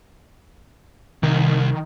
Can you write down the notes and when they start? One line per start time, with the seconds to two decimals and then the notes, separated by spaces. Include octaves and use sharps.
1.23 C2 D#3